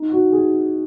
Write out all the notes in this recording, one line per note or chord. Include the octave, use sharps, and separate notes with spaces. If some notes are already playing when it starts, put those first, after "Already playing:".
Already playing: D#4
F#4
G#4